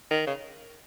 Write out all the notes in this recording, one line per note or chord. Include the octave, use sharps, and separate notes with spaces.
D#3
C#3